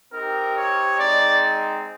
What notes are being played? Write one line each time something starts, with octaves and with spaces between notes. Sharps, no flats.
C4 D#4 G4 A#4
C#5
G#3 C4 D#4 D5